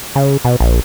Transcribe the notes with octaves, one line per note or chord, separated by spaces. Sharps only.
C#3
B2
A#1